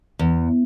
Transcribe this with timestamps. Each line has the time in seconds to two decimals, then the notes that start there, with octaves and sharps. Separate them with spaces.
0.19 E2